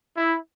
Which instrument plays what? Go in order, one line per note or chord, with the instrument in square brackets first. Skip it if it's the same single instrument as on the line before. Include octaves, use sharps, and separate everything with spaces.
[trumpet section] E4